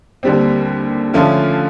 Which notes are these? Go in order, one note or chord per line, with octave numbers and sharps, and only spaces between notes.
D#2 D3 G3 C4
D3 F3 A3 C#4 F4